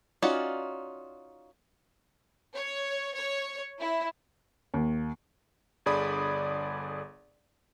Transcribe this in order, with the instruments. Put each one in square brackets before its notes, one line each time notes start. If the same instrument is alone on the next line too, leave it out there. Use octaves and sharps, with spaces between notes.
[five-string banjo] C#4 D#4 F4 F#4 D5
[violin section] C#5
C#5
E4
[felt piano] D#2
[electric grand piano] G1 D3 G#4 D5 B5 D#6